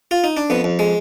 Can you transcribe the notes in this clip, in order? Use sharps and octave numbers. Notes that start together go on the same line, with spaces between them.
F4
D#4
D4
F2 B3
F2
G#3